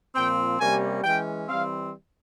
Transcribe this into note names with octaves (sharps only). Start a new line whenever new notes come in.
A#2 F3 C4 G5
C3 G3 A#3 C#4 G#5
E3 G#3 C#4 G5
E3 G3 C4 F5